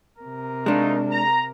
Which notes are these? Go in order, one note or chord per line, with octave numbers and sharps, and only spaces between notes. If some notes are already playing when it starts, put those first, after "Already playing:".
C3 A#4
G#3 A3 D4 D#4 F4
A#5